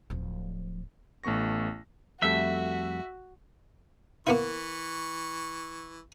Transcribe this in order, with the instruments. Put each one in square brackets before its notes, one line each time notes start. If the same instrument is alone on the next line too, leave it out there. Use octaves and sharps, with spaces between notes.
[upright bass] D1 F3
[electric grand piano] A1 A3 B3 C#6 A#6
[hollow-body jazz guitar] F2 G3 A3 [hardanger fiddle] F#4 [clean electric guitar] E5
[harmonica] E3 C#6 [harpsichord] A#3 B3 E4